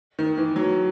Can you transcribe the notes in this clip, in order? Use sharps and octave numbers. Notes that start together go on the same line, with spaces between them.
D#3
E3
F#3